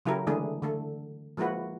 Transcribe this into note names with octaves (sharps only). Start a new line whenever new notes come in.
C#3 F#3 E4 G4 A4 A#4
D3 E3 G#3 A3 D4 G#4
D3 A3 A4
F3 G#3 A#3 E4 F#4 B4